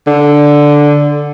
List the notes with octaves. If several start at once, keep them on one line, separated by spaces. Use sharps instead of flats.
D3